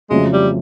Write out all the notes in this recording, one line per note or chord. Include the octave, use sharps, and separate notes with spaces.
F2 C#3 F#3 G#3 A3 C#4
G3